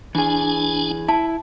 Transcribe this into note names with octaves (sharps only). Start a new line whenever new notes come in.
E3 D4 G#4 G#5
E4 A5